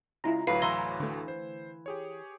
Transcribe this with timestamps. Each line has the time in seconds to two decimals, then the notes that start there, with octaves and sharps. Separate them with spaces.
0.24 C#3 G#3 E4 F4 A#5
0.47 D2 A2 F#3 B4 F5
0.62 E3 A#5 C6
1.00 D3 A3
1.28 C5
1.86 G4 G#4 C#5